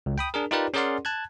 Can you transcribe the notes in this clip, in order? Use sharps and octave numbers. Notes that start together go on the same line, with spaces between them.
C#2
G5 B5 D#6
D4 G#4 A#4
D#4 F4 G4 A#4 B4 D5
C#4 G#4 A#4 D5 F#5 C6
A5 F#6 G#6